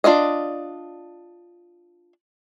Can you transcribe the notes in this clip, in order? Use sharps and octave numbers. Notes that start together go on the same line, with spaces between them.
D4 F4 D5 D#5